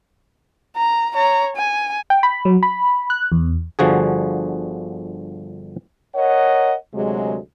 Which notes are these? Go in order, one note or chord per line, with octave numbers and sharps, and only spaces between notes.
A#5
C#5 A#5
G#5
G5
B5
F#3
B5
F#6
E2
G1 D3 F3 F#4 G#4
A#4 C#5 D#5 F#5
D2 C3 F#3 G#3